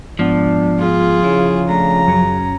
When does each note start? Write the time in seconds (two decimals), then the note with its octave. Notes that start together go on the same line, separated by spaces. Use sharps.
0.19 G#2 F3 B3 D4 F#5
0.79 F4 G#4
1.24 C#3 E4
1.69 A3 D4 A#5
2.07 F#2 F#3 C#4